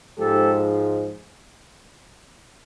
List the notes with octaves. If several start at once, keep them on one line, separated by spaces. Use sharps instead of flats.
G#2 F3 G#3 G4 A4